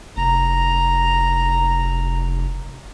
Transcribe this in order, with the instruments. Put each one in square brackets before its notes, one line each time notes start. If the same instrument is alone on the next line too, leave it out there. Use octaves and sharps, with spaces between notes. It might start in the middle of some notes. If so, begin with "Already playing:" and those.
[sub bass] F1 [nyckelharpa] A#5